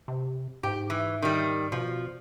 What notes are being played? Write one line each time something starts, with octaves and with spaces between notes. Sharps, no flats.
C3
G#2 G4
E3
D#3 G3
B2 F3